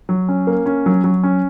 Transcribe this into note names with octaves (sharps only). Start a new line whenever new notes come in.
F#3
C#4
A#3
C#4
F#3
F#3
C#4